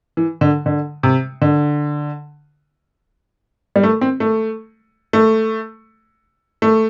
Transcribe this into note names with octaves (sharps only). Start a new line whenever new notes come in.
E3
D3
D3
C3
D3
G3
A3
C4
A3
A3
A3